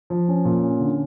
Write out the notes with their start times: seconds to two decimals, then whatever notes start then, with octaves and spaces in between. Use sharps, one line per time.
0.10 F3
0.28 C#4
0.45 A#2
0.63 C#4
0.80 D3